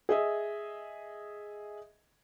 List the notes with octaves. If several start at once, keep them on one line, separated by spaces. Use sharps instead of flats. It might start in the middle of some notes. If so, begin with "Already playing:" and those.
G#4 D#5 E5